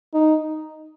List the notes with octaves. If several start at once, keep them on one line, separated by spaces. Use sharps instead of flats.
D#4